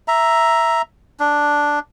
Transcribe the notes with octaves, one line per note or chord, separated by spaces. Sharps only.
E5 A#5
D4